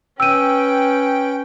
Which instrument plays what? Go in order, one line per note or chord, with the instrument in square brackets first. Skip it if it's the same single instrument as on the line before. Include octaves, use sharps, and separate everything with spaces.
[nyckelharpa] C#4 B4 [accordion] G5 [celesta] E6 D#7